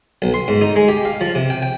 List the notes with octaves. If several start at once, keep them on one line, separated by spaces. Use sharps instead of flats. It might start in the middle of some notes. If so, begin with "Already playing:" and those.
B1
C6
G#2
D#4
G#3
G4
F5
F3
C3
G5
G5